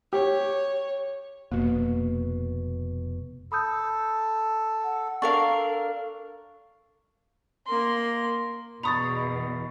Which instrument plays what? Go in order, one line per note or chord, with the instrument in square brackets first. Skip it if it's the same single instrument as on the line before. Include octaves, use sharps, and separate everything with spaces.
[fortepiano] G4 [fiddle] C#5
[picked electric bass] F1 B2 [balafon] A#3
[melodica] A4 [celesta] B5 D#6 G6
[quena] F#5
[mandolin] D4 A#4 F5 [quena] A4 [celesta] C#6
[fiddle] A#3 C6
[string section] E2 B2 [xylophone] A#5 D#6 [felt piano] B5 C#6 A6